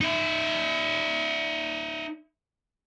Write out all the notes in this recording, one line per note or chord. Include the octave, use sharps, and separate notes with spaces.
D#4 E5